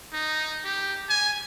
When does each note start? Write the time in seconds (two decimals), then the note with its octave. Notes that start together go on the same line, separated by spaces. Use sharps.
0.13 D#4
0.65 G4
1.09 G#5